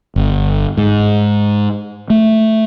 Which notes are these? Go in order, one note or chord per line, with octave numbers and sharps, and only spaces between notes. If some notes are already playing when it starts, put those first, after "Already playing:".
G1
G#2
A3